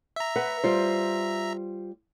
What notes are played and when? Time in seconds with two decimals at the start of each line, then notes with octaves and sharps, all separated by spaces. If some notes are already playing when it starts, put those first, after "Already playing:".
0.16 E5 A#5
0.36 B4 F#5
0.64 G3 F4 C5